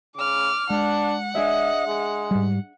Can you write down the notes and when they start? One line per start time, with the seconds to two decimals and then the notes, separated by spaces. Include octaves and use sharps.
0.16 C#3 D6 F6
0.70 G#3 D4 F#5
1.35 D4 G#4 D#5 E5
1.87 G#3
2.31 G#2 G3